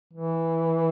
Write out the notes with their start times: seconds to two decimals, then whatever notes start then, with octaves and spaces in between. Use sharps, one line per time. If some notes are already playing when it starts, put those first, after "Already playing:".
0.13 E3